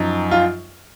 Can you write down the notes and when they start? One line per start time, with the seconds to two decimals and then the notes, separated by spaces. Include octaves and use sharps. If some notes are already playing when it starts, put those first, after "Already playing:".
Already playing: F#2 F3 D#4
0.31 F4